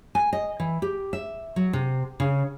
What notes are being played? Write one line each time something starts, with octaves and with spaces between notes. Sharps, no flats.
G#5
D#5
E3
G4
E5
F#3
C3
C#3